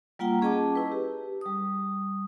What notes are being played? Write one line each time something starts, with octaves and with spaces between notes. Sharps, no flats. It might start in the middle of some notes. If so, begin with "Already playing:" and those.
G3 A#3 F4 F#5 G5 A#5
C#4 G#4 D#5 A5 D6
E4 B4
G4
G3 D#6